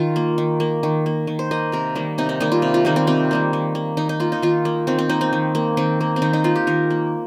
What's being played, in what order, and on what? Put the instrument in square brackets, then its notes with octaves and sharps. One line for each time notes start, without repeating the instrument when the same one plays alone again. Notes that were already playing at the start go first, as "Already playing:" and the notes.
Already playing: [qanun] D#3 F4
A#3
D#3
A#3
D#3
A#3
D#3
C5
A#3 D#5
C3 A#4
D#3 G3 A#3
C3 D#4
D#4
D#3 G3 A#3 D#4
F4
C3
F4
D#3 G3 A#3 D#4
C4
C3 C4
D#3 G3 A#3
D#3
A#3
D#3 D#4
D#4
A#3 F4
D#4
D#3 F4
A#3
D#3 C4
C4
A#3 D#4
C4
D#3
A#3
D#3 C4
A#3
C4
D#3 D#4
D#4
A#3 F4
G4
D#3 A#4
A#3